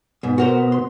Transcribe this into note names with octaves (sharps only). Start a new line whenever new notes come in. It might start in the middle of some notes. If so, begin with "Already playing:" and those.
G#2 B2 B3
F#4 A#4 C5
C6